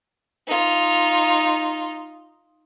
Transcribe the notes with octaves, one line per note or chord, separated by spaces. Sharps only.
D#4 F4